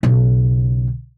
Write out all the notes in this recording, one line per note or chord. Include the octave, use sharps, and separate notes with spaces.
B1 C#3